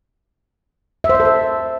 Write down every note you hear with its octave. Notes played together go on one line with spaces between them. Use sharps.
E5
C5
E5
A4
E5